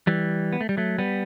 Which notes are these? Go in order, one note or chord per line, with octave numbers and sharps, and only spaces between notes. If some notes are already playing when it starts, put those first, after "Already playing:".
E3 G3
B3
A3
G3
F#3 A3
G3 B3